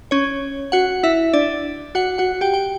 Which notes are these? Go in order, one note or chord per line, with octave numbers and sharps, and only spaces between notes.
C#4 C#5
F#4 F#5
E4 E5
D4 D5
F#4 F#5
F#4 F#5
G4 G5
G5